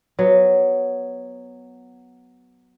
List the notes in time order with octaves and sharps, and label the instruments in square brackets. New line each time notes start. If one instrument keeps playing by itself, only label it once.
[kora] F#3 B3